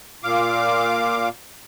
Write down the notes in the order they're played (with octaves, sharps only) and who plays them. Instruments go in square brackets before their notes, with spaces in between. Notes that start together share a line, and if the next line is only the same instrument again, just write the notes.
[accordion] A#2 F5 D6